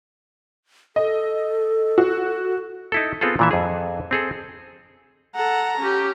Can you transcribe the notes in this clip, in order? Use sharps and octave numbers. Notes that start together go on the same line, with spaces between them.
A4 D#5
F#4
D#4 E4 A4
B3 C4 F4 G#4 A4
A#2 E3 E5
F2 G#4
C4 G#4 A4
A4 F#5 A#5
C#4 G4